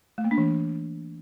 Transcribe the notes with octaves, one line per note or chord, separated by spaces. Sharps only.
A3
A#3
D4
E3